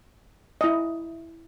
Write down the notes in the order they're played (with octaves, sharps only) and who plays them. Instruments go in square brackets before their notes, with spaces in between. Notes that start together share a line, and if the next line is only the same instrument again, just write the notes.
[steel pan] E4 D#5